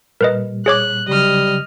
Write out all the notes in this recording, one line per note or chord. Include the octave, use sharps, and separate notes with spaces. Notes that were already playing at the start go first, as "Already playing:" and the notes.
A#2 G3 A#4 B4 D#5
G#4 C#5 D6 F#6
C#3 F#3 G3 D#5 F6